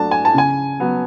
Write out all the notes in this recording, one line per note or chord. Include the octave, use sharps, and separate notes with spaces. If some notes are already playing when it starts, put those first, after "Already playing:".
Already playing: F#3 A3 D4 A5
G#5
A5
C#3 G#5
F#3 B3